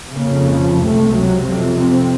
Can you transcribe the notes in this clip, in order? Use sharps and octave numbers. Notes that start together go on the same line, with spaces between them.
F2 C#3 A#3
F3
C#2 C3 A3
F#3
F2 C3 C4
C4